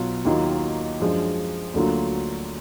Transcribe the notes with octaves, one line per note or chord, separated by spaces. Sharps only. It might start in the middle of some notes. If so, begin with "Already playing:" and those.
Already playing: B1 B2 F#3 F4
D#2 D#3 F#3 A#3 F4
F#2 F3 G#3 D4
D2 D3 F#3 A#3 F4